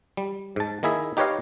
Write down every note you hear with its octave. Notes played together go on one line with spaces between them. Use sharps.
G3
G#2 A5
D#3 A#3 E4 G#4 E5
D#4 G4 B4 C#5 D#5 F5